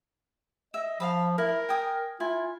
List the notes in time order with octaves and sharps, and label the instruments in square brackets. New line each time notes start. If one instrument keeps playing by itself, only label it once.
[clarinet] D#5 [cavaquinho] E5
[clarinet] F3 [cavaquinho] F5 A5 B5
[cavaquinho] E4 [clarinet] A#4
[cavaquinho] G5 G#5 D#6
[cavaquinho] E4 G#5 [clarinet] F4